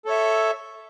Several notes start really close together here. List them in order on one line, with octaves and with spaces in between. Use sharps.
A4 C#5 E5